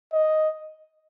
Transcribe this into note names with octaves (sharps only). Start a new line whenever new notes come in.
D#5